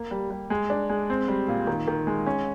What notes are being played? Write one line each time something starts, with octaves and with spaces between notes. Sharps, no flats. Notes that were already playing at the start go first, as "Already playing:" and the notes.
Already playing: A#3
G3
G3
G#3
D4
G#3
C4
G3
A#2
D#3
D#3
G#3
C#4